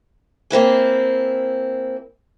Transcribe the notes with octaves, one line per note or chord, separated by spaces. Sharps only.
A#3 C4 E4 G#4